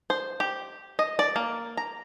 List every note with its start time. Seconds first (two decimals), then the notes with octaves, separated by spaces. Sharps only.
0.10 C5
0.40 G4
0.99 D#5
1.19 D5
1.36 A#3
1.77 A#5